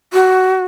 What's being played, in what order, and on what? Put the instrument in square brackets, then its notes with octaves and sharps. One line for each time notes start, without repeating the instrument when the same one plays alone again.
[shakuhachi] F#4